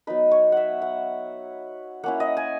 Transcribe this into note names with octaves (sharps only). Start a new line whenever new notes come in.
F#3 B3 D#4 B4
C#5
E5 F#5
F#5
A#3 C#4 E4 F#5
D#5
G#5